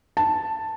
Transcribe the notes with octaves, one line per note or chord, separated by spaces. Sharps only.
A5